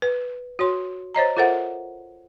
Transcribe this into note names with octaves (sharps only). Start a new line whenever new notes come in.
B4
F#4 C#5 C6
C5 C#5 D#5 A#5
F4 A4 A#4 C5 E5 F#5